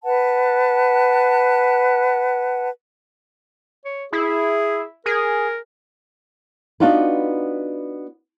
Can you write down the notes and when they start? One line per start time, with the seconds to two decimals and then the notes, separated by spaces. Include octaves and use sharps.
0.04 B4 F#5 A5
3.85 C#5
4.13 E4 G#4
5.06 G#4 A#4
6.80 B3 D4 D#4 F4 F#4 B4